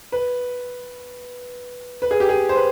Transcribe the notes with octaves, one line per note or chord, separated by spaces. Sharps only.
B4
B4
G#4
G4
G#4
C5
B4